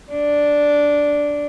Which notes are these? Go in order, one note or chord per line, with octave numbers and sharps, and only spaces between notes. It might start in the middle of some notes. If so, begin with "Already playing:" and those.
D4